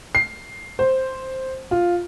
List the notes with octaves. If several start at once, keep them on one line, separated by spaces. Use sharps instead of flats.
C7
C5
F4